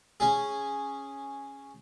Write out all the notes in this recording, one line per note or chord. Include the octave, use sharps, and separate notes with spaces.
C#4 G#4